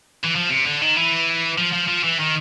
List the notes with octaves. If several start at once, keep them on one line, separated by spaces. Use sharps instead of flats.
E3
F3
C3
D3
D#3
E3
F3
F3
F3
E3
D#3